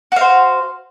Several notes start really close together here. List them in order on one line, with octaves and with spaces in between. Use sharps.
F#4 F5 C5